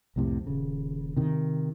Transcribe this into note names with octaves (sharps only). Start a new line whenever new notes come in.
C2 F2 A2 C3
D#1 C#3
C3 D#3